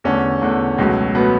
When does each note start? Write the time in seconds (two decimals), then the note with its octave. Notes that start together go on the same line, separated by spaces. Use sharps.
0.04 E2 D3 A3 C#4
0.42 E2 D3 A3
0.78 C#2 B2 F#3 A3
1.15 B2 F#3 A3 B3